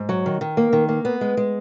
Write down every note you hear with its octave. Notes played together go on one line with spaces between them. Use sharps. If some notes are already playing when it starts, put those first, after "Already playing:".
Already playing: G#2
F#3
D#3
D#3
A#3
D#3
A#3
B3
G#3
G#3